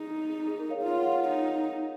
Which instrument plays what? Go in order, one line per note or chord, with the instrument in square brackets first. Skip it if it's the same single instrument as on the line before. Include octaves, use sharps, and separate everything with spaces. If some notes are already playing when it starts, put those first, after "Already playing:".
Already playing: [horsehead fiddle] D#4 [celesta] G#4
[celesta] G#4
A#4
C#5 F5
[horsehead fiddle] F4 [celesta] C#5 F5
[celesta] F#5
C#5 F5
[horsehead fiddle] D#4